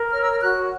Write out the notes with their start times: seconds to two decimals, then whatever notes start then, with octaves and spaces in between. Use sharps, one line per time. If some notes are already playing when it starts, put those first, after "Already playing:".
Already playing: A#4
0.12 C#5 F6
0.21 E6
0.30 F6
0.41 F#4 F#6